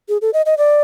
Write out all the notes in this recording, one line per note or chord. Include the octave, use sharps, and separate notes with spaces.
G#4
A4
D#5
D#5
D5